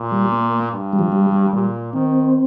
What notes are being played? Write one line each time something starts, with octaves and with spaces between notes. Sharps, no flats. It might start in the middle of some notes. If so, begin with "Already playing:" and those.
Already playing: A#2
G3
A#3
G2
G3
F3
G3
G3
A#2 G3
D#3 C4